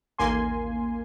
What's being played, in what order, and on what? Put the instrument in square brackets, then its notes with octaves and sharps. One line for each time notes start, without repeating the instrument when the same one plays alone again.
[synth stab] A1 D#2 A#3 G#5 C6